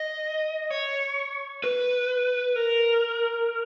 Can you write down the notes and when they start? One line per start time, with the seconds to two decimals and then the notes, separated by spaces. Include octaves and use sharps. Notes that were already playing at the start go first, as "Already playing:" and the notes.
Already playing: D#5
0.70 C#5
1.64 B4
2.56 A#4